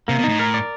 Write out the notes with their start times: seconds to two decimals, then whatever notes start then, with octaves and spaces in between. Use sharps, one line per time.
0.08 C3 A#3
0.19 B2
0.24 D#4
0.29 A2
0.39 A#4
0.54 D5